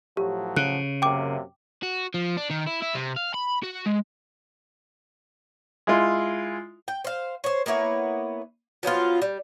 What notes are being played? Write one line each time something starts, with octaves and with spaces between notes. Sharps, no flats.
A2 F3 F#3 G4
C#3 F#6
F#2 C3 A#3 G5 D6
F#4
F3
D4
D#3
E4
E4
C3
F5
B5
F#4
G#3
G#3 E4 F4
G5
C5 F5
C5 C#5
A#3 B3 E4 C#5
F3 F#3 B3 F4
G3